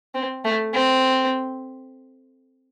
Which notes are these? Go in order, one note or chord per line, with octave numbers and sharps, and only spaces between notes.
C4
A3
C4